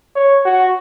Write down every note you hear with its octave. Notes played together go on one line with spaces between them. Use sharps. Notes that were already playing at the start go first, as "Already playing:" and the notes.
C#5
F#4